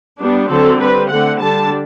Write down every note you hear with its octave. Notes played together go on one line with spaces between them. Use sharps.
G3 B3 D4
D3 F#3 C4 A4
G3 C4 B4
D3 A3 C4 F#5
D3 G3 D4 A5